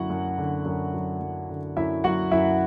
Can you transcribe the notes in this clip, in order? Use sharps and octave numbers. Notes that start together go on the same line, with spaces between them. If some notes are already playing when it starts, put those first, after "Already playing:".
Already playing: F#2 D3 F#3 E4 F#4 F#5
F#2
D3
F#2
F#3
F#2
D3
F#2 E4 E5
F#3 F#4 F#5
F#2 E4 E5